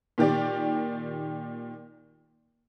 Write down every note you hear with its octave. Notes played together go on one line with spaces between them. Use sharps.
A#2 D#3 G4 D5